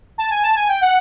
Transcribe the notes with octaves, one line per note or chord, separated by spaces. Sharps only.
A5
G#5
A5
G#5
G5
F#5